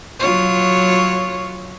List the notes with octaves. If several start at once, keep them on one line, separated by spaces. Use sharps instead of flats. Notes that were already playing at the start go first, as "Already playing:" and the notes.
F#3 F4 C#5